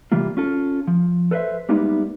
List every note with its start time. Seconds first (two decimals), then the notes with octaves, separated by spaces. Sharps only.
0.12 C3 E3 G3 A#3 F4
0.37 C#4 F4 A4
0.87 F3
1.31 A4 B4 C5 D#5 E5
1.69 G3 G#3 A#3 B3 D#4 E4